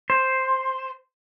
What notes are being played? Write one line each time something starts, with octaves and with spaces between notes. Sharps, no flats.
C5